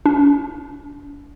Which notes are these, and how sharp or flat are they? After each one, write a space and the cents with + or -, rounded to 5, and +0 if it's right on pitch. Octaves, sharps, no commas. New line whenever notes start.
D4 -40